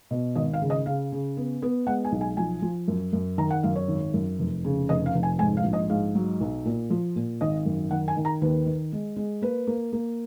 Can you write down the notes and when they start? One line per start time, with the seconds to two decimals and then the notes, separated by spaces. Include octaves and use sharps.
0.11 B2
0.36 G#1 D#5
0.53 F5
0.62 C#3
0.70 D#5
0.86 C#3 F5
1.12 C#3
1.37 B3
1.62 B3
1.87 G#3 F#5
2.05 G#5
2.12 B1
2.21 G#5
2.37 F3 G#5
2.62 F3
2.88 F#2
3.13 F#2
3.38 D#3 A#5
3.51 F#5
3.63 F#2 F5
3.76 C#5
3.88 G#1
4.14 F#2
4.39 F1
4.65 C#3
4.89 F1 D#5
5.06 F5
5.15 F1
5.23 G#5
5.39 G#2 G#5
5.57 F5
5.64 A#1
5.73 D#5
5.90 G#2 F5
6.15 F#3
6.41 B1
6.65 A#2
6.90 F3
7.16 A#2
7.41 G#1 D#5
7.66 F#2
7.91 D#3 F#5
8.08 G#5
8.17 D#3
8.25 A#5
8.42 D#2 B4
8.66 D#3
8.92 G#3
9.17 G#3
9.42 A#3 B4
9.67 A#3
9.93 A#3